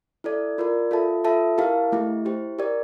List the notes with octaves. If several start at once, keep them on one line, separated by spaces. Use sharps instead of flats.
E4 A4 D5
F4 A#4 D5
F4 A4 E5 A5
F4 A4 E5 A5
E4 G4 A#4 F5 A5
A3 E4 G4
E4 G4 C5
G4 A#4 D5